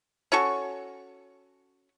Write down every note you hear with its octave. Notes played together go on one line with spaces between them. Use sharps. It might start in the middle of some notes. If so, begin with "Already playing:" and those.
C#4 F#4 A4 C#6